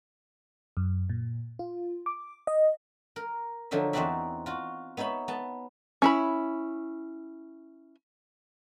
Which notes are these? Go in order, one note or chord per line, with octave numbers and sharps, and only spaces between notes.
F#2
A#2
F4
D6
D#5
A#4
D3 F3 F#3 D#4 E5
E2 C4 D#4 F#4 D5 E5
F4 F#4
B3 D#4 C#5 E5 B5
B3 A5
C#4 E4 B5